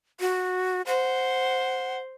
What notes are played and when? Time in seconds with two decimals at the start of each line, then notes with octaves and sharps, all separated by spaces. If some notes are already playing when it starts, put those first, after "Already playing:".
0.20 F#4
0.87 C5 F#5